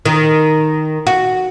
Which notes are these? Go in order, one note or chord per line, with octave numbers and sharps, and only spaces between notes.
D#3
F#4